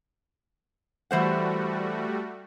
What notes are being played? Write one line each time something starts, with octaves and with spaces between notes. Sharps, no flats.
E3 G3 A3 F#4 C5 F#5